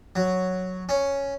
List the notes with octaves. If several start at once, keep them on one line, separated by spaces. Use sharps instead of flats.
F#3
C#4